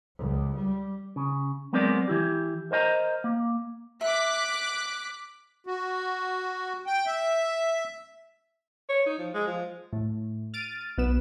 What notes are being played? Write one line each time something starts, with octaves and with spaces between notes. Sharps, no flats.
C#2
G3
C#3
F#3 G#3 B3 C4 A#4 D5
E3 E4 G4
A#4 C5 D#5 G5 A#5
A#3
E5 D6 F#6 B6
F#4
G5
E5
C#5
D#4
F3
G#3
F3
A2
F6 A6 D7 D#7
B1 B3 E7